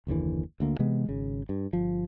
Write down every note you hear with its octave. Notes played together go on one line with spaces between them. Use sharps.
F#1 D#2 D3 E3
D2 D3 A#3
C3 E3 G#3 B3
G#1 C#3
G2
G1 F3